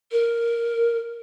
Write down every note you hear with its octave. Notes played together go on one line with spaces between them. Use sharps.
A#4